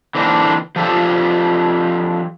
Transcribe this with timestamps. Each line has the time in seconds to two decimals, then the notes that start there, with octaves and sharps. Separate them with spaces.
0.15 D3 E3 A#3 C4 D4 D#4
0.76 F3 D4 F4 G4 A4